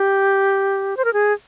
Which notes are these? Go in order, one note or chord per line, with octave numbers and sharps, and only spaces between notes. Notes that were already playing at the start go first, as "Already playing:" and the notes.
Already playing: G4
C5
A#4
G#4